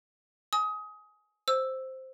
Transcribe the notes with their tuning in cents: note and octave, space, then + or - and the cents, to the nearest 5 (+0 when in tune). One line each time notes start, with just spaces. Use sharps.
G#5 +15 D#6 +25
C5 +0 E6 +0